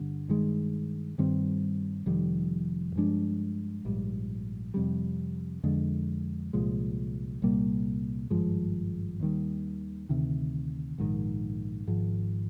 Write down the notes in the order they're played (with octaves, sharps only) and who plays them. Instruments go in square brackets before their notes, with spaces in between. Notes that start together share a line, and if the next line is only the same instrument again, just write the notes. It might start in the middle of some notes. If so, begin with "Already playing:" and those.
Already playing: [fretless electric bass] G1 D3 G3
G2 D#3 G#3
G2 D#3 G3 C4
F1 F2 D#3 G3
G2 F3 G#3 D4
A#1 G#2 G3
F2 C3 G3
F2 D3 G#3 D4
C2 A#2 F3 G#3
C2 A#2 G3 A#3
G#1 G2 F3 G#3
D#2 D#3 G3
D2 C3 D#3
A#1 G#2 D#3
G#1 G#2 F3